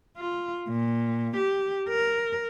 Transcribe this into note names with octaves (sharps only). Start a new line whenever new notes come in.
F4
A#2
G4
A#4